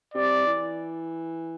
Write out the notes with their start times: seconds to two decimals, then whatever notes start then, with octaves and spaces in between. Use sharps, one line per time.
0.14 C3 D5
0.46 E3